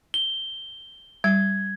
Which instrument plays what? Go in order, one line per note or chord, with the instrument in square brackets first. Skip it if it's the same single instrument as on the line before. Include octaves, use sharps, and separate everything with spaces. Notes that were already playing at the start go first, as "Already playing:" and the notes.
[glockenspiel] G7
[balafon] G3 [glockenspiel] G#6